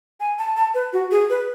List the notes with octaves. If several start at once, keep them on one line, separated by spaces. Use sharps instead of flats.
G#5
A5
A5
B4
F#4
G#4
B4